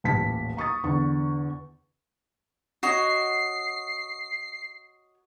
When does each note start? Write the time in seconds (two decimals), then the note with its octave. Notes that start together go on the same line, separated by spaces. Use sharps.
0.04 D#1 A1 A5 B6
0.57 A#5 C#6 D#6 A6
0.84 E2 D3 C#6
2.83 F#4 C#5 D#5 C7